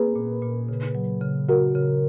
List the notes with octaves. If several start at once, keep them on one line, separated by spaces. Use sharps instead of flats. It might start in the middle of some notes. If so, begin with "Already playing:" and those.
Already playing: A#3 G#4 B4
A#2
A#2
C#3
F#3
C#3
C#3 F#4 A#4
C#3